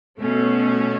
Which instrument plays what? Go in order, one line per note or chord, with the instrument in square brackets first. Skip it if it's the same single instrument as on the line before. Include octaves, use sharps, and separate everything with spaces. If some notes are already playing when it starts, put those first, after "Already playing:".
[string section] B2 A3 C#4